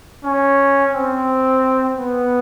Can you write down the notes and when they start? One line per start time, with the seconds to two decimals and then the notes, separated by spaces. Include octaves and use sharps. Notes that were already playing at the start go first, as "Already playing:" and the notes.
0.24 C#4
0.93 C4
1.97 B3